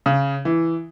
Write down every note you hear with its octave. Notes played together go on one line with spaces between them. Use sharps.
C#3
E3